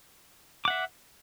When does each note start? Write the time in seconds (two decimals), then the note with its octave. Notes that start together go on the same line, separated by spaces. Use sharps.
0.65 D6
0.68 F#5
0.70 E5